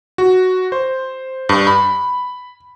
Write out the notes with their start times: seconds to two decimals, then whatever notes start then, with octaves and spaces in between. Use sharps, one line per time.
0.18 F#4
0.72 C5
1.49 G2
1.67 B5